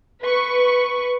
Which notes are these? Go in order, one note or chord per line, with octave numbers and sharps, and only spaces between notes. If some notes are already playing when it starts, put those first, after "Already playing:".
B4 C#6